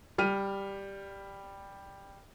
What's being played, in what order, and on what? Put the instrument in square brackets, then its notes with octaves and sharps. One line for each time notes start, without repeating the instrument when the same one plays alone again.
[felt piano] G3 F6 D#7